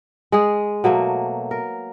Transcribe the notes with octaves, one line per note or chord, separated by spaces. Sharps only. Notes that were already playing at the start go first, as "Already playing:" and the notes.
G#3 G#4
B2 F#3 A3 A#3
A#4